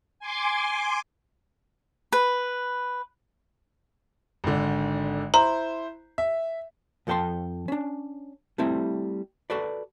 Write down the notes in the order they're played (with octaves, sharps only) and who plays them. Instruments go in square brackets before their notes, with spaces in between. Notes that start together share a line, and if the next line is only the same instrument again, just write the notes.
[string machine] G#5 C6 D6
[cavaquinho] B4
[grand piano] G#1 D3
[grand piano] E4 C5 [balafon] A#5
[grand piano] E5
[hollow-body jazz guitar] F2 F3 A4 G5 A5 C6
C#4 D4
G3 A3 C4 E4
F#4 A4 B4 D5